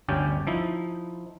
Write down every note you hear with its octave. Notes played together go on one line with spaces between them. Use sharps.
G1 D2 C#4 D4 G4 D5
F3 D#4 E4